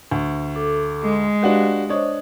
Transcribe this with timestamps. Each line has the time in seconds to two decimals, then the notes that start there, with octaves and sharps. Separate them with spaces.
0.11 D2
0.56 A4 D6
1.03 G#3
1.43 D4 F#4 G4 B4 F5
1.89 D4 C5 C#5 D#5 D#6